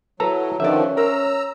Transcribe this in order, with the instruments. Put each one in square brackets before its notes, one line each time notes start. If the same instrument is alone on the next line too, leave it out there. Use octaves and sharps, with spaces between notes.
[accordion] F#3 [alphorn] E4 [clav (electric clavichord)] A4 A#5 [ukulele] B4
[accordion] D3 D#3 F3 [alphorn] C#4 [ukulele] G4 B4 D5 [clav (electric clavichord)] E5
[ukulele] A#4 C5 [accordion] A#5 E6